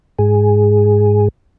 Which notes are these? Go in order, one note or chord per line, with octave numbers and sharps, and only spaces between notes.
G#2 G#4